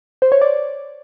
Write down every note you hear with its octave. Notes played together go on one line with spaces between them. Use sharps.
C5
C#5
D5